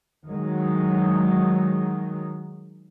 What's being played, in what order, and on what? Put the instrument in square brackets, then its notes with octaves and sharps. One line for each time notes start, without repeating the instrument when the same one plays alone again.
[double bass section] D#3 F#3 G#3